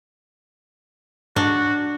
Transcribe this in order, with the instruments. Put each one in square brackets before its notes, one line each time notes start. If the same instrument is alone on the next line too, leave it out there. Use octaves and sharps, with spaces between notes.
[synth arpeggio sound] G#2 [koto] D4 [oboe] F#4